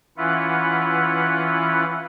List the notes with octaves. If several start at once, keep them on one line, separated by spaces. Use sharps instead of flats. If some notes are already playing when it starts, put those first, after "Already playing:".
E3 C#4 E4 F4 B4 F#5